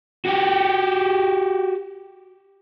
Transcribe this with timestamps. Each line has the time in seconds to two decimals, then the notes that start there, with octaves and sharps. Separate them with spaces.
0.25 F#4 G4